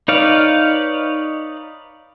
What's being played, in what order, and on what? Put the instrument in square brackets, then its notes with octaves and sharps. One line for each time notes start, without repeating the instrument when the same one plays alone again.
[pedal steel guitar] D#4 B4 C#5 D5 F5